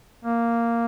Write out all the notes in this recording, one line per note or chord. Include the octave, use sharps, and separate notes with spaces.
A#3